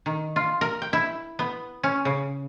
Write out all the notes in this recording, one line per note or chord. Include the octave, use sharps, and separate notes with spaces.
D#3
F4
A#4
G5
E4
B3
C#4
C#3